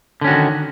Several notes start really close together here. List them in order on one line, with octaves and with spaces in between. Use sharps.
D3 C#4 F#4 D#3